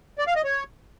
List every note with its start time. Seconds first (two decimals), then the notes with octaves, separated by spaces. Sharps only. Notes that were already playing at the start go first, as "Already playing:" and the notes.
0.19 D5
0.27 F5
0.36 D#5
0.44 C#5